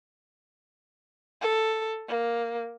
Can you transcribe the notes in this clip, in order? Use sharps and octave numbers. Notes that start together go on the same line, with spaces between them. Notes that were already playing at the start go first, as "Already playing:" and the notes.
A4
A#3